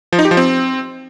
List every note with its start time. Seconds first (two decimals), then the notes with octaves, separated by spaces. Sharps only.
0.13 F3
0.19 D#4
0.25 G4
0.31 F3
0.37 C4